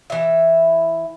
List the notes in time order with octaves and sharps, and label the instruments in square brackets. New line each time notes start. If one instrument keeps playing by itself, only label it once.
[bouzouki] E3 E5